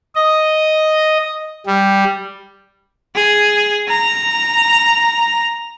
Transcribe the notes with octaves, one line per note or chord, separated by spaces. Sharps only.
D#5
G3
G#4
A#5